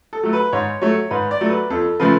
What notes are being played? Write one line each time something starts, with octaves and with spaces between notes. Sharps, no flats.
A4
F#3 A3
B4
G#2 C#5
F#3 A3 C#5
G#2 B4
D5
F#3 A3
B4
F2 A4
C#3 F3 A3 B4